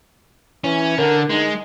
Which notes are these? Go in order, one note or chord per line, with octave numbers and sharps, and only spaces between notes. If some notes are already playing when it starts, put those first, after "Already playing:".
E3 C#4
D3 A#4
G#3 D#4